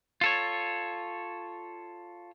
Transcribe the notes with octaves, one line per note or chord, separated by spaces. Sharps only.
F4 A4 C#5